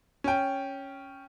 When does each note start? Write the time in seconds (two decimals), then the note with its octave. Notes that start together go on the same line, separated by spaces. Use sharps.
0.24 C#4 G5